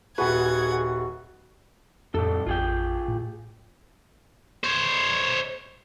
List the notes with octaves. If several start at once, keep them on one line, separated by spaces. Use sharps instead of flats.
D#1 F#4 G#4 B4 F#5 G#6
C2 F2 A2 A4
A1 F2 F4 G#4 G5
A2
C5 C#5